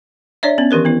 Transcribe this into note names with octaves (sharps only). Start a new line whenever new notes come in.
D4 C#5 D5 E5
B3 C#4
D#3 E3 G4 A#4 C5
B3 E4